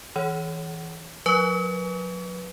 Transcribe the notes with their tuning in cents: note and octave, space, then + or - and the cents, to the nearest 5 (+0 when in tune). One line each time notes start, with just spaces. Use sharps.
E3 -15 C#5 +0
F#3 -35 B4 +0 C#6 +35